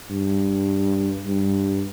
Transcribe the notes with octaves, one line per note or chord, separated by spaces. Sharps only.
G2
G2